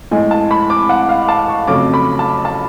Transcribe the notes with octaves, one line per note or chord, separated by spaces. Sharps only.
A2 G#3 G#5
A5
B5
D6
F#5
F5
A5
C#6
F2 C#3 F#3 A3 D6
B5
A5
A5